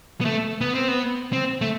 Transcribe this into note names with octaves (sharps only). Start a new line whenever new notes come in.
B3
A3
B3
C4
B3
C4
A3